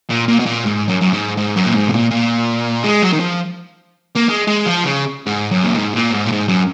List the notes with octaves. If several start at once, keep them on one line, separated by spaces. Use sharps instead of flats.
A#2
A#2
B2
A#2
G#2
F#2
F#2
G#2
G#2
F#2
A#2
G#2
B2
A#2
A#2
G#3
F#3
D#3
F3
A#3
G#3
G#3
F3
C#3
G#2
F#2
A#2
G#2
A#2
G#2
A#2
G#2
F#2